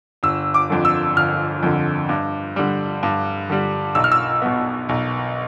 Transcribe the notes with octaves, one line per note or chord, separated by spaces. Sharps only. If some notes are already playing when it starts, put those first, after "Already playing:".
G1 E6
D6
F2 D3
E6
G1 F6
F2 D3
G2
D3 G3
G2
D3 G3
B1 E6
F6
E6
B2 B3
B1